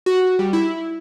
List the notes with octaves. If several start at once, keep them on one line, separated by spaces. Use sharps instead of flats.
F#4
G3
E4